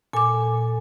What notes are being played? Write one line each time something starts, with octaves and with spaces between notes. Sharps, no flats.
A#2 A4 G#5 D6